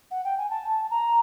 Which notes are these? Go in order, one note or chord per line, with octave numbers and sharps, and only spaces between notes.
F#5
G5
G#5
A5
A#5